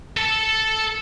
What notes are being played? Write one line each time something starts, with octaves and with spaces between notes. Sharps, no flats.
A4 A5